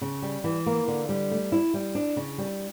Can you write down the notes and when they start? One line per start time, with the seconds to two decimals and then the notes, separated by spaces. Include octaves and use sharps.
0.01 C#3
0.22 G3
0.44 E3
0.66 A#3
0.88 D3
1.09 G3
1.31 A3
1.52 E4
1.74 G3
1.95 D4
2.16 C#3
2.38 G3